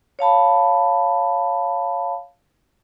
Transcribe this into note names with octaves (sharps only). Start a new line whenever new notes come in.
C#5 F5 A5 B5